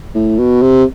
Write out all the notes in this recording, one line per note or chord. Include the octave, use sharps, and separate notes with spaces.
A2
B2
C3